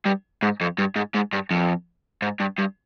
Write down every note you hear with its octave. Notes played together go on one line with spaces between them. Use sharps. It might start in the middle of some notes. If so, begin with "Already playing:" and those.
G2
G#2
F2
G2
G#2
G#2
G2
F2
G#2
G2
G2